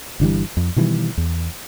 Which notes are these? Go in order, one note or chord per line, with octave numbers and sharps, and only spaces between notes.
G1 D3 E3 G3
F2
B2 D#3 E3 G3
E2